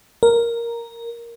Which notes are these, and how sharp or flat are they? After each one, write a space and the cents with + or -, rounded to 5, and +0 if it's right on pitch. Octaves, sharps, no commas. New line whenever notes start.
A#4 +0